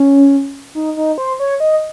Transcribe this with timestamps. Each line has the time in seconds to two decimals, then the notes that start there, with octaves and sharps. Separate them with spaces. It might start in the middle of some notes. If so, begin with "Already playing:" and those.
Already playing: C#4
0.75 D#4
0.97 D#4
1.18 C5
1.40 C#5
1.60 D#5